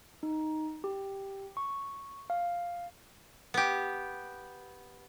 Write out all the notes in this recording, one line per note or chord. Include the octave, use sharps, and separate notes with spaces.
D#4
G4
C#6
F5
B3 G4